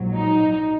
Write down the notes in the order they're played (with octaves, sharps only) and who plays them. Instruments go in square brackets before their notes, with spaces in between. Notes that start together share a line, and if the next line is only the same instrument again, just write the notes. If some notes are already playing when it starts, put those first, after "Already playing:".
Already playing: [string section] A#1 G#2 F#3
D#4